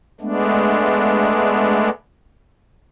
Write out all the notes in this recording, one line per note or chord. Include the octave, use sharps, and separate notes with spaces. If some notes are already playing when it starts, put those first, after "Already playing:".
G#3 A3 B3 D4